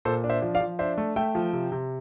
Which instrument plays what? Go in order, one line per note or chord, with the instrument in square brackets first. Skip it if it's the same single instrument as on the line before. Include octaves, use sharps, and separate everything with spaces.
[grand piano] A#2 A4 C5
D4
C5 E5
F3
D5 F5
F3
D4 C5 E5
A3
A3 E5 G5
F3
C3
C3